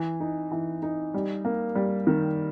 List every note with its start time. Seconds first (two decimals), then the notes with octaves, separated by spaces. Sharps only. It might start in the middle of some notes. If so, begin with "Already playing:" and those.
Already playing: E3
0.20 D#4
0.52 E3
0.83 D#4
1.14 G3
1.45 A#3
1.75 G3
2.07 D#3